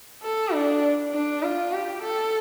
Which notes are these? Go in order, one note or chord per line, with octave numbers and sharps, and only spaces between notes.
A4
D4
D4
F4
G4
A4